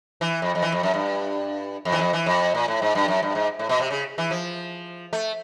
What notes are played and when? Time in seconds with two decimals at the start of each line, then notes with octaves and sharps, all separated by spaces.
0.21 E3
0.42 F2
0.55 F2
0.62 E3
0.72 F2
0.83 F#2
0.94 G2
1.85 F2
1.92 E3
1.99 F2
2.13 E3
2.26 F2
2.55 A#2
2.68 A2
2.82 G#2
2.95 G2
3.08 F#2
3.22 G2
3.35 G#2
3.59 A2
3.69 B2
3.80 C3
3.90 C#3
4.18 E3
4.31 F3
5.13 A3